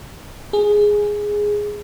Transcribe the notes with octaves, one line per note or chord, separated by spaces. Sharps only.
G#4